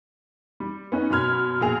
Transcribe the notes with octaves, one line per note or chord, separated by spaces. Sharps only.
G3
B3 C#4 D#4
F#2 B2 B5 F6 G#6
A#1 B2 G#4 F7